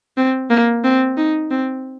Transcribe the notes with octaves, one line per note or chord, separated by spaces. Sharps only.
C4
A#3
C4
D#4
C4